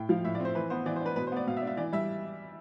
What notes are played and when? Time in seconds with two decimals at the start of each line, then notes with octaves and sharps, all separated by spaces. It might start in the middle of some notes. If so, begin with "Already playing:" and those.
Already playing: A2 G5
0.09 F3 F5
0.24 A2 E5
0.35 D5
0.40 C4
0.45 C5
0.55 E3 B4
0.70 B3 C5
0.86 E3 D5
0.96 C5
1.01 D4 B4
1.16 B2 B4
1.27 C5
1.32 B3 D5
1.47 B2 F5
1.57 E5
1.62 D4
1.67 E5
1.77 E3 D5
1.93 G3 E5